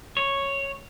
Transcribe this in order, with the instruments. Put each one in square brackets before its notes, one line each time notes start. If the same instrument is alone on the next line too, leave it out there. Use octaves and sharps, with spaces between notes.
[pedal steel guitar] C#5